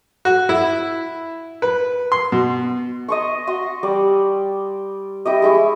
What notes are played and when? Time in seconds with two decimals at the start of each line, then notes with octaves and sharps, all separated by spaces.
0.25 F#4
0.49 E4
1.62 B4
2.12 C6
2.32 B2
3.08 D#5 C6 C#6
3.47 F#4 C6 C#6 D#6
3.83 G3 D5
5.25 E4 G4 D#5
5.42 G#3 E4 C#6